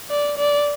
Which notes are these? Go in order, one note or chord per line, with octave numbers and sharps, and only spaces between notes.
D5
D5